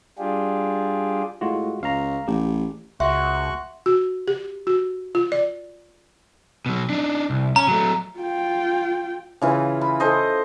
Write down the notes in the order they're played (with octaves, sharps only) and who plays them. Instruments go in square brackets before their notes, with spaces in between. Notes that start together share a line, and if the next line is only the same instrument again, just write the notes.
[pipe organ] G3 D4 F4 G4 G#4
[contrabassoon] A2 [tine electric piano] G#3 F4 F#4
[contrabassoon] C#2 [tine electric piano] F5 A#5
[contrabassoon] A1 [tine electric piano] G4
[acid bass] C#2 [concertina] F#4 C#6 F#6 [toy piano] E5 [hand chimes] F#5 C6
[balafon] F#4
G4
F#4
F4
D5
[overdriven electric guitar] B2 F#3
D4 D#4
C2
[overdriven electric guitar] C#4 [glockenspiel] A#5
[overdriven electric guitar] F#3 A3
[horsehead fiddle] F4 G5
[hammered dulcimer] C#3 E3 F4
B5
A4 C5 D#5